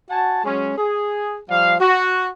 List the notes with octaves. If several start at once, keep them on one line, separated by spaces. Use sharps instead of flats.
F#4 F#5 G#5 A5
F#3 G#3 C#4
G#4
F3 G3 F5
F#4